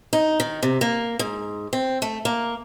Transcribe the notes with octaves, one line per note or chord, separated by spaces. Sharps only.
D#4
D#3
C3
A#3
G#2
C4
A3
A#3